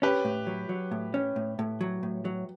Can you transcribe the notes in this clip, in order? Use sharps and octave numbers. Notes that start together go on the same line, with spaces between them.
C#4 G4 B4
A2
F#3
F#3
A2
C#4
A2
A2
F#3
A2
F#3